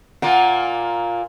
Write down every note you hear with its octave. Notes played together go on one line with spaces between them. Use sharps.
A#2 A#3 F4 F#5